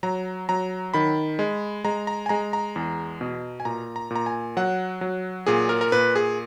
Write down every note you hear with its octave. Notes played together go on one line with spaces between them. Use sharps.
F#3 A#5
F#3 A#5
D#3 B5
G#3
G#3 A#5
A#5
G#5
G#3 A#5
A#5
E2
B2
G#5
A#2 A#5
A#5
A#2
A#5
G#5
F#3 F#5
F#3
A#2 G#4
A#4
A#4
A#2 B4
G#4